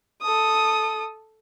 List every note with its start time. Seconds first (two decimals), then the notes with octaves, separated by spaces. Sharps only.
0.22 A4 D#6